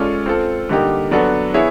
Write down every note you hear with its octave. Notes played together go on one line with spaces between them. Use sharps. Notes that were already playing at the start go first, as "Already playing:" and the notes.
Already playing: G#3 C#4 F4 A4 D5
C4 F4 A4
D3 G3 A#3 D#4 G4
F#3 B3 D4 F#4 A4
B3 E4 G#4 C#5 E5